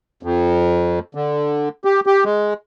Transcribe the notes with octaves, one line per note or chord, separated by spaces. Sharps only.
F2
D3
G4
G4
G#3